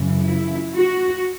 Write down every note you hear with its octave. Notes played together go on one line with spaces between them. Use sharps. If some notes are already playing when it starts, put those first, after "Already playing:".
Already playing: F#2 C#3 E3
E4
F#4